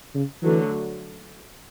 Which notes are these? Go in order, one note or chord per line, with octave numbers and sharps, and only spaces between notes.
C#3
D3 E3 F#3 A3